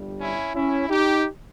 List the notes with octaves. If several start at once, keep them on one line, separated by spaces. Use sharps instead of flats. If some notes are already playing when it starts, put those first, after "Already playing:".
Already playing: G1 G2 G3
C#4 E4
C#4 E4
D#4 G4